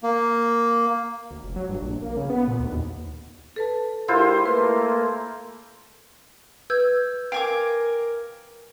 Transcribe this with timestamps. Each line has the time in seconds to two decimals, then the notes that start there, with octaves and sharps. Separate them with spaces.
0.03 A#3
1.31 D2
1.44 F1
1.56 F#3
1.69 G2
1.82 A#1
2.02 A#3
2.17 C#3
2.30 B3
2.48 A#2
2.59 D2
2.72 D#2
3.56 A4 B4 A5
4.08 G#2 E4 F4 G4 A#4 C5 C6
4.46 A3 A#3 B4
6.70 B4 E6 G6 G#6
7.32 A#4 F5 G5 G#5 D6